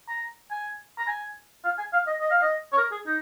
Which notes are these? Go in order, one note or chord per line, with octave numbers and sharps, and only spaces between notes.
A#5
G#5
A#5
G#5
F5
G#5
F5
D#5
D#5
F5
D#5
C#5
A#4
G#4
D#4